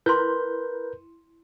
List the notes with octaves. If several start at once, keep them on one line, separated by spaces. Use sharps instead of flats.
E4 A#4 B4 C6 G6